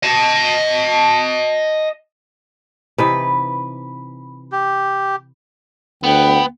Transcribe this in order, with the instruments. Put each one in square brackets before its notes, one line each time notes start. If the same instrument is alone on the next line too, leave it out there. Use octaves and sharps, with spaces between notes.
[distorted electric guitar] D#5 A5
[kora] C3 E3 D#4 [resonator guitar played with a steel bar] B4
[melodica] G4
[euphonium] D2 [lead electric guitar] B3 [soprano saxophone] G5